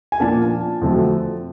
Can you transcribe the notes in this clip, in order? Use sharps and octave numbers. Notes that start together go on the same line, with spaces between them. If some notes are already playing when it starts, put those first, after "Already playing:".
G#5
A#2 F3 A#3 D4 A5
F2 D3 F#3 A3